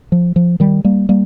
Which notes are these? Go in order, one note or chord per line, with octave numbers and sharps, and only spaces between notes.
F3
F3
D#3 G3
G3 A#3
G3 A#3